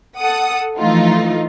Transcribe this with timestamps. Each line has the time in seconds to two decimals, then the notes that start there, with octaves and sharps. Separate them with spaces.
0.18 A4 F#5 D#6
0.78 E3 F3 A3 D#4 F4